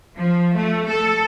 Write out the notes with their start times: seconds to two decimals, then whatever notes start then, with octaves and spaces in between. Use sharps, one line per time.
0.18 F3
0.56 A3
0.88 A4